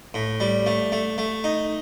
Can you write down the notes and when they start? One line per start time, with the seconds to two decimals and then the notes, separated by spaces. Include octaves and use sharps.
0.14 A2
0.40 G3
0.66 A3
0.92 A3
1.18 A3
1.44 D#4